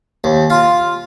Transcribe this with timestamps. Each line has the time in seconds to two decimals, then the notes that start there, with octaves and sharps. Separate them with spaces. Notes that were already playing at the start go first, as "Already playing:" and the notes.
0.24 D#2
0.50 F4